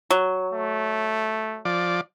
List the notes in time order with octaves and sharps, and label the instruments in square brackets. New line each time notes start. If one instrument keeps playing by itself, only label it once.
[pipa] F#3
[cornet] A3
[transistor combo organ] F3 D5